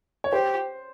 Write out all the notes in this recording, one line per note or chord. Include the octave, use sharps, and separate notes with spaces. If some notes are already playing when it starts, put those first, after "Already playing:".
C#5
G4 C5